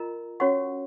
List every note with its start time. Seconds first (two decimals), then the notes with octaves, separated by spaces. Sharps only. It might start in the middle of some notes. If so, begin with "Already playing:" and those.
Already playing: F4 A#4 D#5 A#5
0.40 C#4 F#4 C#5 F#5 C#6